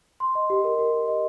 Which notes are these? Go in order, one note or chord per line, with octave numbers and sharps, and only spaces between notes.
C6
D#5
G4
A#4
G4
G4
D#5